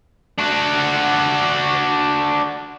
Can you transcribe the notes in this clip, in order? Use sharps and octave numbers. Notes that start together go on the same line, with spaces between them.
D4 F#4